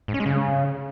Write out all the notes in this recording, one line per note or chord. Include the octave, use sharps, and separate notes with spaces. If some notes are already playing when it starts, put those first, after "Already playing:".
G#2
C#4
G#3
C#3